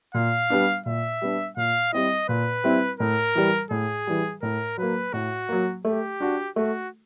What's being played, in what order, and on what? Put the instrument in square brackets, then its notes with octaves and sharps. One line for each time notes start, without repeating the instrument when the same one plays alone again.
[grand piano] A#2 [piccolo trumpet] F5
[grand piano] G3 B3 D4
[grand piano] A#2 [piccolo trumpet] E5
[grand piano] G3 B3 D4
[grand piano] A#2 [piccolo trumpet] F5
[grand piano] G3 C4 E4 [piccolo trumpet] D#5
[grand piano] A#2 [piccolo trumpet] B4
[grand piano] G3 C4 E4
[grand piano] A2 [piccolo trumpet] A#4
[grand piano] E3 G3
[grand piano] A2 [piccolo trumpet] G#4
[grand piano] E3 G3
[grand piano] A2 [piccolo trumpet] A#4
[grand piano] F#3 A#3 [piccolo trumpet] B4
[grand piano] A2 [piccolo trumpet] F#4
[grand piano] F#3 A#3
[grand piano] A3 [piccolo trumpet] G4
[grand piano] D4 F#4
[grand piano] A3 [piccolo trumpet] F#4